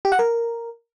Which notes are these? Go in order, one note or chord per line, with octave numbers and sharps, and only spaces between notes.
G4
F#5
A#4